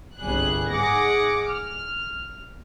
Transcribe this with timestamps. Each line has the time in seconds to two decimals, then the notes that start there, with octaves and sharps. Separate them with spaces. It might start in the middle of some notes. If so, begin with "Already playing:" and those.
0.18 G1 C2 G3 G#4 F#6
0.70 G#2 G#4 F#5 D6 A#6 C#7
1.48 F6